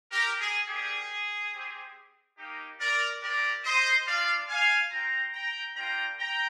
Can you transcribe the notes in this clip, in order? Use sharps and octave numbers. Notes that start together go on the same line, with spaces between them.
G4 A#4
G#4
G3 A#3 D#4 G4 G#4
C4 G4
A#3 D#4 G4
A#4 D5
C4 G4 A#4 D5
C5 D#5
G3 D4 F4 D5 F5
F5 G#5
C4 F4 G5 A#5
G5 A#5
G3 A#3 D4 F4 G5 A#5
G5 A#5